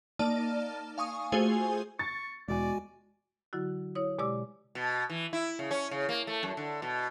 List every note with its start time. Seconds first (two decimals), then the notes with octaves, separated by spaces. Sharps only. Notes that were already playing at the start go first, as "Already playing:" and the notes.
0.19 A#3 D#4 D5 A5 F6
0.98 F5 G#5 C#6 D#6
1.32 A3 F4 F#4 G#4 C5 G#5
1.99 C#6 A6
2.48 E1 E2 G#3 F#4 D5 G#5
3.53 D3 F#3 E4 F#4
3.95 E4 C#5 D#6
4.19 B2 G#3 G4 D5 D6 E6
4.75 B2
5.10 E3
5.33 E4
5.59 C#3
5.71 C#4
5.91 C#3
6.09 A#3
6.27 A3
6.43 F#2
6.57 D3
6.82 B2